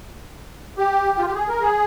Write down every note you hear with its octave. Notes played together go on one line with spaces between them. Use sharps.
G4
F4
G4
G#4
A#4
G#4